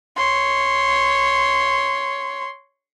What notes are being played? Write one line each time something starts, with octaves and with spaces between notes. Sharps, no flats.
C#5 C6